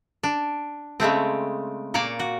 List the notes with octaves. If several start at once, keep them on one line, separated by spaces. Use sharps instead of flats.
D4
C#3 G#3 A3 C4
A#2 A#3 C#5 D5
F#4